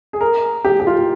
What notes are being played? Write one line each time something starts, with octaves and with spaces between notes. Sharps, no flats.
G#4
A#4
G4
G4
F4